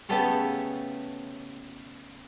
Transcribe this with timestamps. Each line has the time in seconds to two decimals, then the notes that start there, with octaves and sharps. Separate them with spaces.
0.09 C#3 A3 B3 G4 A4 C#5